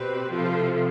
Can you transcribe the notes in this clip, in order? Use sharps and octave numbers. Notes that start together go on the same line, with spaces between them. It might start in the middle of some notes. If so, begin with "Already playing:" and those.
Already playing: B2 C4 G4 B4
C3 F3 C4 F4 A4